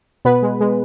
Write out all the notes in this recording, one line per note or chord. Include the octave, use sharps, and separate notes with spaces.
B2 B3 B4
G#3
G#3